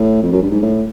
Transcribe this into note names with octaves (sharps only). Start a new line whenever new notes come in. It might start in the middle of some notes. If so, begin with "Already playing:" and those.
Already playing: A2
F2
F#2
G2
G#2
A2